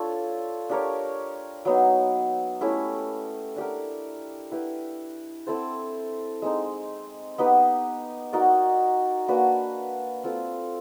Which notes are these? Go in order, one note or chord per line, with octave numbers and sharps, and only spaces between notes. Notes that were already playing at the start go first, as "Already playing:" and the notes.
Already playing: D4 F4 A4 C#5
D4 G4 A#4 C#5
F#3 B3 D#4
A3 C#4 E4 G4
D4 G4 A#4
E4 G4 B4
C4 E4 A4 C5
G#3 C4 D#4
B3 D#4 G4 B4
D#4 F#4 A#4 D5
A#3 D4 F#4 B4
C4 F4 A4